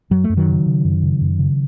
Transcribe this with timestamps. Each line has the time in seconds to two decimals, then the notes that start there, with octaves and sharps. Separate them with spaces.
0.11 F#2 F#3
0.24 A3
0.29 F#2
0.37 D#3 F#3
0.48 C#3
0.66 C#3
0.84 F#2
1.03 C#3
1.21 F#2
1.39 C#3